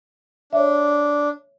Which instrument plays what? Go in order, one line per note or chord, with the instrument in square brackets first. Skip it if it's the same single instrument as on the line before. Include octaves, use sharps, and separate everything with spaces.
[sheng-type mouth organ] D4 [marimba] C#5 E5